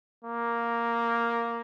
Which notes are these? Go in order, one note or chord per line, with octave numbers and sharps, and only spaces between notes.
A#3